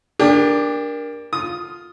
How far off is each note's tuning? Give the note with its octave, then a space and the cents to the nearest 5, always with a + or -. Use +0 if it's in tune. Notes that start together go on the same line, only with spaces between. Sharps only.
A#3 +10 D4 +0 G4 +35
F4 +0 D#6 +0